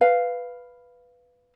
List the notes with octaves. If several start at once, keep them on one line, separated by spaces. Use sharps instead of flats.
B4 F5